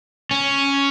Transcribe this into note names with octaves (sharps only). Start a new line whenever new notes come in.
C#4